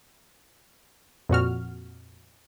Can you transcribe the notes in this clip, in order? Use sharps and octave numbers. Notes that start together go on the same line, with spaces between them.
F2 A#2 F#4 F6